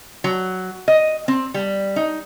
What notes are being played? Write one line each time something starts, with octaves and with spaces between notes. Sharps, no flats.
F#3
D#5
C4
G3
D#4